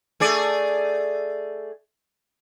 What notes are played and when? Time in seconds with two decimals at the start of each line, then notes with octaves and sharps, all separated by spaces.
0.20 A3 G#4 D5